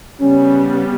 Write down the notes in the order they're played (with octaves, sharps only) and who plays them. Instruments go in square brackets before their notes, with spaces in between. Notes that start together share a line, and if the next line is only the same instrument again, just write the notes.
[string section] C#3 G3 B3 [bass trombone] C#4